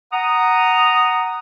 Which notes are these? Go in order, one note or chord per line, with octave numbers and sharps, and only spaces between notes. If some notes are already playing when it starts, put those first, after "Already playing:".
F#5 A#5 D#6